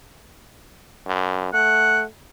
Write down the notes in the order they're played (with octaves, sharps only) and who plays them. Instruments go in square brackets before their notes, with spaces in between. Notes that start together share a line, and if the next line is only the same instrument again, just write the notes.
[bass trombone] F#2
[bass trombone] A3 [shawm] F#5